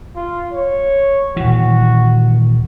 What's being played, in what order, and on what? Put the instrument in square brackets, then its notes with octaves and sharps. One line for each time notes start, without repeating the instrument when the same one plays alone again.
[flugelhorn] F4
C#5
[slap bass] D#1 E3 [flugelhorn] F#4